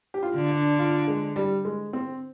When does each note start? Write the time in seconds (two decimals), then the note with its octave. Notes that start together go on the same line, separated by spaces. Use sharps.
0.14 G4
0.23 F4
0.36 D3
0.51 D4
0.79 F4
1.07 G#3
1.36 G3
1.65 G#3
1.93 C4